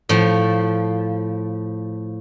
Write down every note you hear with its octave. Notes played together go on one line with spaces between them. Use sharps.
A2 F3